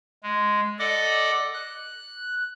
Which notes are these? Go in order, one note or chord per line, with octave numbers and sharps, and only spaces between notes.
G#3
A4 D5 D#5 F#5 D6
F#6